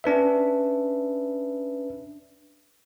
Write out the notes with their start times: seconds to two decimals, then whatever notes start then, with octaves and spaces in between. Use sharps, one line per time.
0.04 C#4 D4 B4 E5